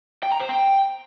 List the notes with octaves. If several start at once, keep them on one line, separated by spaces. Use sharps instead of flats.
G5
A#5
C5
G5